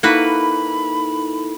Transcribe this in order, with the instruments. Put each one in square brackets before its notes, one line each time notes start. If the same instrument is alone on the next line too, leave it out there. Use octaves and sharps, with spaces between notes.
[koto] A#3 F#4 B4 [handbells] D#4 E4 A4 [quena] B5